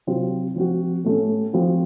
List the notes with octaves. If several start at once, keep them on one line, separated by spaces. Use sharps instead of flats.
C3 F#3 C4 F4
F3 C4 F#4
A2 A3 C#4
F3 C4 F#4